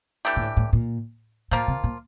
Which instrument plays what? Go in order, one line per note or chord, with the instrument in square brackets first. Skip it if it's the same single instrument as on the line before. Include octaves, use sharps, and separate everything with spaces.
[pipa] E3 A3 D4 G4
[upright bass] A#2
A2
A2
A#2
[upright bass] A#2 [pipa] F3 A#3 F4
[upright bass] C3
A#2